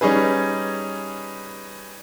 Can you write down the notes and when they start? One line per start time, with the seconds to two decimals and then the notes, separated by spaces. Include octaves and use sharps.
0.01 G3 C#4 D#4 G#4 B4